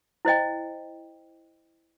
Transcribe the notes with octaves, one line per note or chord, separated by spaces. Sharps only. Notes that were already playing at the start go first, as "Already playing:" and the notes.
E4 C5 D#5 G5